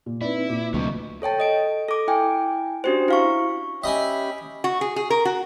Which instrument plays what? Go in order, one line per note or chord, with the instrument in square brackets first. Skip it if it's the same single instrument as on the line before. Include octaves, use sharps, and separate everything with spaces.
[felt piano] A#2
[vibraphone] C4 D#4 B4 [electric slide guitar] E4 [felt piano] D5
[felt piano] A#2 [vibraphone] D6
[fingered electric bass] D2 [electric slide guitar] C3 F#3 [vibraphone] D#5 C#6
[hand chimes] A4 C#5 G5 A5
A4 D#5 D7
A4 D6
E4 G5 G#5
C#4 D4 F#4 G4 C5
E4 F5 C#6
[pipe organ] C#4 G4 B5 [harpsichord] D#5 G#5 [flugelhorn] E5
[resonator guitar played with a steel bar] F#4
G#4
G#4
A#4
F#4